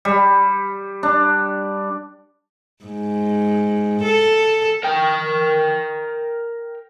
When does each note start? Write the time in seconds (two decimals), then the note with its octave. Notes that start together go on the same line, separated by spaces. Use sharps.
0.05 G3
1.03 D4
2.84 G#2
4.03 A4
4.84 A#4 G5